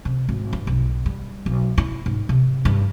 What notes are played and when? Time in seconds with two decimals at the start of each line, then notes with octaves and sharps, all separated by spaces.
0.05 C3
0.29 G#1
0.53 G2
0.67 B1
1.06 G3
1.46 B1
1.78 E4
2.06 G#2
2.29 C3
2.65 G2